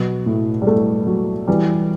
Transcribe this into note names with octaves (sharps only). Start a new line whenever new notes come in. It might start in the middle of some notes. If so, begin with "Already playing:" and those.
Already playing: B2 F#3 B3
A2
G3
A2 A3
F#3
E3 G3